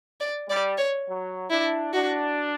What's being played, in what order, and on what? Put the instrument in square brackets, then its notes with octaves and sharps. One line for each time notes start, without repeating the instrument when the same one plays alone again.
[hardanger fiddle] D5
[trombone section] G3 [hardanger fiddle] D5
[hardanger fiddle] C#5
[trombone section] F#3
[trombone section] D4 [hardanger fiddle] E4
[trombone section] D4 [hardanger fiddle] F#4